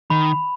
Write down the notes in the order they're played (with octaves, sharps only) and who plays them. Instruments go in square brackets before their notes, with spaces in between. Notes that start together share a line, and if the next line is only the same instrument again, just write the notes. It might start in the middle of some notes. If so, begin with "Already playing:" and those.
[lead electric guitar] D#3 [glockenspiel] B5